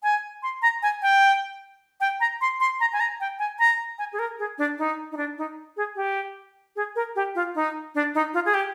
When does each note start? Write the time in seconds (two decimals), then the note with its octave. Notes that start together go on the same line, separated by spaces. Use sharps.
0.03 G#5
0.43 C6
0.62 A#5
0.82 G#5
1.02 G5
2.00 G5
2.20 A#5
2.41 C6
2.60 C6
2.80 A#5
2.93 G#5
3.00 A#5
3.20 G5
3.39 G#5
3.59 A#5
3.98 G#5
4.13 G#4
4.19 A#4
4.39 G#4
4.58 D4
4.79 D#4
5.12 D#4
5.17 D4
5.38 D#4
5.77 G#4
5.96 G4
6.76 G#4
6.96 A#4
7.16 G4
7.35 F4
7.55 D#4
7.95 D4
8.15 D#4
8.34 F4
8.46 G#4
8.54 G4